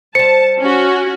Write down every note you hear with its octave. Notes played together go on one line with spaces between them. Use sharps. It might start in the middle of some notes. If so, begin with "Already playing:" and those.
G3 C5 A5 C#7
C#4 F#4